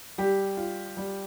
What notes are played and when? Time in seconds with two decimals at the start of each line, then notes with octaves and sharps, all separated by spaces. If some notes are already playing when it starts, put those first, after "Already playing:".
0.18 G3 G4
0.57 F4
0.97 G3